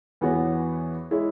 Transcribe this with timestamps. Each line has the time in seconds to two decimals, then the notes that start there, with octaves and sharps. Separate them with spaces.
0.21 E2 E3 B3 F#4 C#5
1.11 G#3 E4 C#5